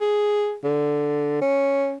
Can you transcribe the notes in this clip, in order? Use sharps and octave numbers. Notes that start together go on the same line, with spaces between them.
G#4
D3
C#4